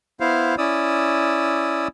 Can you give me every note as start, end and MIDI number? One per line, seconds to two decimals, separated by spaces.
0.20 0.55 59
0.20 0.55 64
0.20 0.55 72
0.20 0.55 77
0.58 1.88 61
0.58 1.88 64
0.58 1.88 74
0.58 1.88 87
0.58 1.88 88